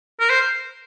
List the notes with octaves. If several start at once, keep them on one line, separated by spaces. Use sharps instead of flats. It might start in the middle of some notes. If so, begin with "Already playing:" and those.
A#4
C5